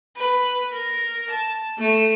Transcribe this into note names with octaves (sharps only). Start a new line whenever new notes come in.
B4
A#4
A5
A3